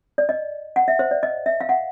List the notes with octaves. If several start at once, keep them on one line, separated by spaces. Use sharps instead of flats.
D5
D#5
F#5
E5
C5
D5
D#5
E5
F5
F#5